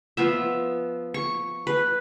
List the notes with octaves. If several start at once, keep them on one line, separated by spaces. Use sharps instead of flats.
F3 B3 E5
C#6
B4